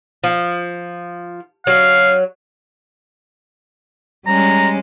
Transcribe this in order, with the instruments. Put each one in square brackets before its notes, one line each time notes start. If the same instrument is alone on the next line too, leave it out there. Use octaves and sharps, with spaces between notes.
[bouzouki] F3
[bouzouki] F#3 [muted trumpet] F5
[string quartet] G3 G#3 C#4 [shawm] A#5